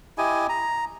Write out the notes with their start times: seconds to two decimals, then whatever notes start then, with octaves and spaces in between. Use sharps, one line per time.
0.18 E4 G4 D#5 G#5
0.49 A#5